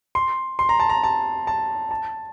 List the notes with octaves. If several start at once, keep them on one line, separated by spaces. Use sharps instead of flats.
C6
C6
A#5
A5
A#5
A5
A5
A5